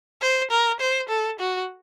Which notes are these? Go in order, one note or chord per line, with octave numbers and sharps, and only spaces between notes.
C5
A#4
C5
A4
F#4